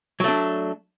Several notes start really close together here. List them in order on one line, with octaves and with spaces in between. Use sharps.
F#3 A3 D4